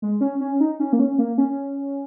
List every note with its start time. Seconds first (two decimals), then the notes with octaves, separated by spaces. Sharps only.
0.02 G#3
0.21 C#4
0.41 C#4
0.60 D#4
0.80 C#4
0.93 A#3
0.99 C#4
1.18 A#3
1.38 C#4